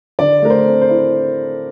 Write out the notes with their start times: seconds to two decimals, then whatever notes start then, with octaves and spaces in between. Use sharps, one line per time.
0.19 D3 D5
0.42 A3 A#4
0.50 C5
0.66 C4
0.81 C5
0.89 E4